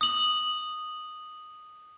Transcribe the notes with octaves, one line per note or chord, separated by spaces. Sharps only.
D#6 F#7